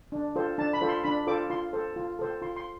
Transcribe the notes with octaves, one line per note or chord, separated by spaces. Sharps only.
D4
F4 A4 C5
D4 A5
B5
F4 A4 C5
C6
D4 B5
F4 A4 C5 D6
F4 C6
A4 C5
F4
A4 C5
F4 C6
C6